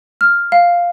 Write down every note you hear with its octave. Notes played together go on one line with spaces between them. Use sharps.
F6
F5